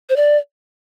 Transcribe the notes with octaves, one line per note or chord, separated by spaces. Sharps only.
C5
D5